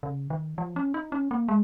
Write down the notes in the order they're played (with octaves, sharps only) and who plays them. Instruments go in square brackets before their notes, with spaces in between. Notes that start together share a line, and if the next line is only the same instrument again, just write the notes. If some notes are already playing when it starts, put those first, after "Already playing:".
[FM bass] C#3
D#3
F3
C#4
D#4
C#4
A#3
G#3